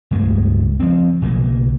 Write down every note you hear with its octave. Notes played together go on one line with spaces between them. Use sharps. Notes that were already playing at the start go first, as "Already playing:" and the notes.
C#2 G2 G#3 A3
F3 C4
B1 C#3 F#3 A#3